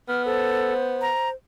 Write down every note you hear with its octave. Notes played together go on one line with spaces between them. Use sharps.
B3 F6
A4 C5
A#5